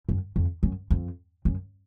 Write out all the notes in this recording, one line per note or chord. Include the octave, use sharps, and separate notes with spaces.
F#2
F2
F#2
F2
F#2